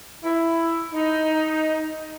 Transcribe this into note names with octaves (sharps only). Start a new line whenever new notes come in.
E4
D#4